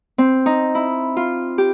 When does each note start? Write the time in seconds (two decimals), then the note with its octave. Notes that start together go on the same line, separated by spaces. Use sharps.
0.18 C4
0.46 D#4
0.75 E4
1.17 F4
1.58 G4